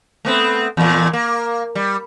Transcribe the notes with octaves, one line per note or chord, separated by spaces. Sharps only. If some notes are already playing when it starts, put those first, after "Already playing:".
A3 B3 C4
E2 A#2
A#3
G3